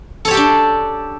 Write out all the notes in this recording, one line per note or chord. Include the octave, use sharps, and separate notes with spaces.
D4 G4 A4 C#5 G5